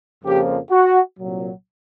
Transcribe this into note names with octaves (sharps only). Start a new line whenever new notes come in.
F2 C#3 F3 A#3 G4
F#4
C2 A#2 F#3